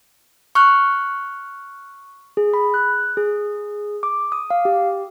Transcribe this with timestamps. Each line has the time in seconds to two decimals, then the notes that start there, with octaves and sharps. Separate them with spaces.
0.55 C#6 F6 F#6
2.37 G#4
2.54 B5
2.74 F#6
3.17 G#4
4.03 D6
4.32 D#6
4.50 F5
4.65 G4